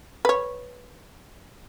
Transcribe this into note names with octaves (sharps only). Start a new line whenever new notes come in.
B4 C#5